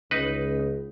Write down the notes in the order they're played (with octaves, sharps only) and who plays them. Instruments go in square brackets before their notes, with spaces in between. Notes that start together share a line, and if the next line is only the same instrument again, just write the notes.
[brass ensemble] C#2 [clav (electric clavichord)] D#4 B4